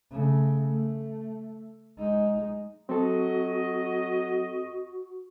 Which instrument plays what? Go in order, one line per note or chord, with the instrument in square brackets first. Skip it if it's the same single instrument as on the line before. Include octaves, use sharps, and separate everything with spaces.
[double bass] C#3 A3
A3
G#3 D#4
[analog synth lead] F#3 [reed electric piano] C4 A4 [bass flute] F#4 [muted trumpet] D#5